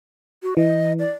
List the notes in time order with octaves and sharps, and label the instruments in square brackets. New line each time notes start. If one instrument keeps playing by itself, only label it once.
[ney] F#4
[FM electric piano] E3 [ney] D#5
[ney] D5